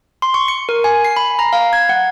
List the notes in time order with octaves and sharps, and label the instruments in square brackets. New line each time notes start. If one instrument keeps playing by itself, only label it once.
[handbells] C6
C#6
C#7
A#4
G#5
C7
B5
A#5
F5
G#6
F#5